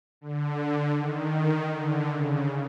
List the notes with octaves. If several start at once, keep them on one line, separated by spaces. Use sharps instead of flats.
D3
D#3
D3
C#3